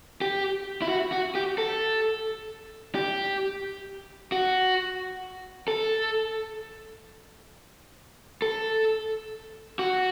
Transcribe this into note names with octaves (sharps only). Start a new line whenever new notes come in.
G4
E4
F#4
F#4
G4
A4
G4
F#4
A4
A4
F#4